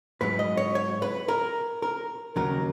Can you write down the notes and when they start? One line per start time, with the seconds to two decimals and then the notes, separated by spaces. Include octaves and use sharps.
0.21 G#2 F#3 B4
0.39 D#5
0.57 C#5
0.75 C#5
1.02 B4
1.28 A#4
1.82 A#4
2.36 D#2 C#3 F#3 A#4